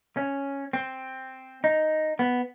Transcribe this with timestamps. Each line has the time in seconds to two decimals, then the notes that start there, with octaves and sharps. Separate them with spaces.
0.17 C#4
0.73 C4
1.64 D#4
2.19 B3